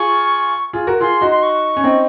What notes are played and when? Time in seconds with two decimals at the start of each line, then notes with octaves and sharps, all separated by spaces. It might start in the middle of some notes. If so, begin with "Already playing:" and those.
Already playing: F4 G#4 C#6
0.73 F4 G#4
0.87 F#4 A#4
1.01 F4 G#4 C6
1.21 D#4 F#4
1.31 C6
1.43 C#6
1.77 C#4
1.84 C4 D#4